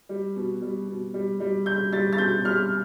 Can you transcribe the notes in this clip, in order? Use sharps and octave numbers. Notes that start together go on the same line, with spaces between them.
G3
B2
G3
B2
G3
G3
G3 G6
G3 A6
A6
B2 G6
G3 F6